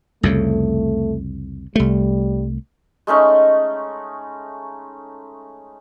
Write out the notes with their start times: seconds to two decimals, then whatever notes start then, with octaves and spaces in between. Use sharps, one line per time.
0.23 C2 F2 C#3 A3
1.76 C2 G3 A3
3.07 G#3 A3 C#4 D#4